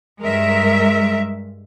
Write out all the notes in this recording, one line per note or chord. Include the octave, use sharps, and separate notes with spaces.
G2 G#3 A#4 E5